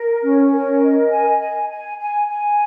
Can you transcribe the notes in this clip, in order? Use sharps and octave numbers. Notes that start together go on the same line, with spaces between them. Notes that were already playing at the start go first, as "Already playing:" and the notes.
Already playing: A#4
C#4
A#4
D#5
G#5
G#5
G#5
G#5
G#5